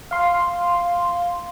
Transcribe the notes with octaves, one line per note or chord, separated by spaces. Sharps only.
F5 C6